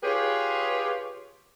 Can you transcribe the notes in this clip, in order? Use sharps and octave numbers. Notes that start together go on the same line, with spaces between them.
F4 G4 G#4 B4 C#5